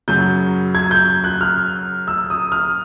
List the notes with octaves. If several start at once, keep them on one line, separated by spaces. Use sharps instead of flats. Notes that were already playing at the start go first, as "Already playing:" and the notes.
F#2 C#3 F#3 G6
G#6
G6
F#6
F6
E6
D#6
F6